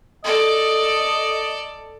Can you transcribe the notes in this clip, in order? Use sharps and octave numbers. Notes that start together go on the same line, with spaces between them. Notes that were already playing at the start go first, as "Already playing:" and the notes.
A4 D5 D#5